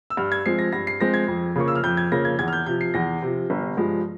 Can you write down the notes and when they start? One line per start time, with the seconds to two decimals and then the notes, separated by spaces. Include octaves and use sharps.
0.10 E6
0.17 G2 F6
0.32 G#6
0.46 F3 G#3 C4 C7
0.59 A#6
0.72 G2 A#6
0.87 C7
1.00 F3 G#3 C4 A#6
1.14 G#6
1.28 F2
1.55 C#3 F3 A#3 C#6
1.68 E6
1.75 F6
1.83 F2 G6
1.97 G#6
2.11 C#3 F3 A#3 A#6
2.25 G#6
2.39 E2 G#6
2.48 F6
2.53 G6
2.66 C3 F3 G6
2.81 C7
2.94 E2 A#6
3.22 C3 F3
3.50 G1
3.77 G2 F3 G#3